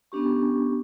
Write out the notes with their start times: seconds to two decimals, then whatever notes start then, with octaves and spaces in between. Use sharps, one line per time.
0.12 B3 C#4 D4 G4 C#6